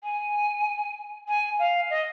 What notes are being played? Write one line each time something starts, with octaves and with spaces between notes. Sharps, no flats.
G#5
G#5
F5
D#5